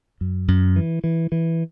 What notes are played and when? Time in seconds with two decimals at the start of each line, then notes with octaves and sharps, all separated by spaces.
0.21 F#2
0.48 F#2
0.76 E3
1.04 E3
1.32 E3